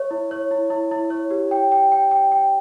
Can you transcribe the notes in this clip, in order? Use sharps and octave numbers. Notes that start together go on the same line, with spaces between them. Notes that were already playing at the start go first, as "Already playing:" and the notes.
Already playing: C#5
E4
C#5
E4
E4
E4
C#5
G4
G5
G5
G5
G5
G5